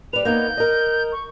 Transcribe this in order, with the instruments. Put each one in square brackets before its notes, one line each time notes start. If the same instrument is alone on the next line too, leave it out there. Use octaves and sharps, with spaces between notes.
[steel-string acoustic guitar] G3 B4 [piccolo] F7
[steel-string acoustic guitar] A#3 B3 D#4 [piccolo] G6
[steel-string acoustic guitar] A#4 D#5
[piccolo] C#6